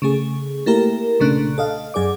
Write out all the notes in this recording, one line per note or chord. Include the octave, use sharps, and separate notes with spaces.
C#3 A3 G#4
A3 A#3 E4 G4 A#4
B1 A#2 C#3 A3 D4 F#6
A4 D#5 F5
F#2 G#4 D5 D6